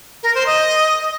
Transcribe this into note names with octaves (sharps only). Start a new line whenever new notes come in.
A#4
C5
D#5